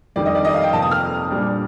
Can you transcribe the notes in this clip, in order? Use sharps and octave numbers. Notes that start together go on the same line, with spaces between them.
F2 D#3 G3 D4 D5
D#5
D5
D#5
F5
G5
F2 C3 F3 A#3 A5
D#6
F6
A#2 G3 D4